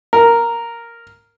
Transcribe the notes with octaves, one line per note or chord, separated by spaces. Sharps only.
A#4